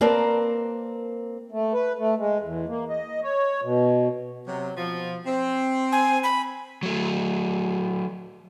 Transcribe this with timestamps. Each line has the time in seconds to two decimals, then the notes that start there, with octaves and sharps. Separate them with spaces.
0.01 A#3 C4 A#4 B4 D5 A5
1.52 A3
1.74 B4
1.99 A3
2.18 G#3
2.42 E2
2.68 A#3
2.90 D#5
3.23 C#5
3.63 B2
4.48 C3 F#3
4.76 B2 F3
5.26 C4
5.92 G#5
6.23 B5
6.83 F#3 A3